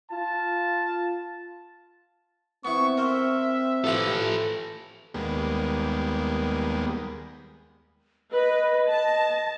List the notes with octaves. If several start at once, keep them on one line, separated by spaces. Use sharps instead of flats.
F4 A5
B3 C4 E4 C#6
A#4 C5 E5
A2 F3 E4 G4 A4 B4
D#2 G3 G#3 A#3 B3
B4 D#5
A5